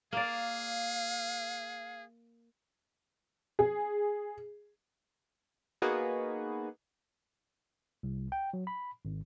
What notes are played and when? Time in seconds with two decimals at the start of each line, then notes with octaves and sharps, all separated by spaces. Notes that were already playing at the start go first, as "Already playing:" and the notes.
0.13 A#3 G#4 D5 F5
3.59 G#4
5.82 A#3 B3 D#4 F#4 G#4 B4
8.03 C2
8.32 G5
8.53 F#3
8.67 B5
9.05 G#1